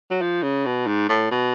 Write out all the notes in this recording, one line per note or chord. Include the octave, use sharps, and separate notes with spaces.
F#3
F3
C#3
B2
G#2
A2
B2